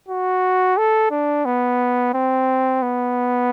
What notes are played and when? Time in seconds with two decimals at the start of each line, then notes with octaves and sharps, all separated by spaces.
0.08 F#4
0.78 A4
1.11 D4
1.45 B3
2.14 C4
2.83 B3